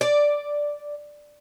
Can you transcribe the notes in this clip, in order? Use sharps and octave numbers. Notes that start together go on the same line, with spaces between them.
D5